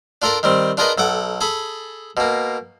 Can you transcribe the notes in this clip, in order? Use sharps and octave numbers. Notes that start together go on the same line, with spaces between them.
D4 F4 A4 A#4 D5
D#3 G3 C4
D4 F4 G#4 A#4 B4 D#5
B1 A4 F#5 D6
G#4 A4 A5 B5
B2 A#3